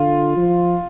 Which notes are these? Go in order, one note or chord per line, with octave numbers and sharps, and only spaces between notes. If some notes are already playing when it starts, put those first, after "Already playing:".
Already playing: D3 F4
F3